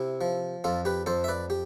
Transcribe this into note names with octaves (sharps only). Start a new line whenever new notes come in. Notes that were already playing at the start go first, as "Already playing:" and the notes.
Already playing: C3 E4 G4
F3
F2 F4 A4
G4 B4
F2 A4 C5
E5
B4 D5
G4